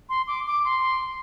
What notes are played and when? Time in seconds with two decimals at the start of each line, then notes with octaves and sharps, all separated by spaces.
0.09 C6
0.27 D6
0.46 D6
0.65 C6